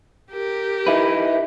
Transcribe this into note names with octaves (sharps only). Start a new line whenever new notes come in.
G4 A#4
D#4 E4 B4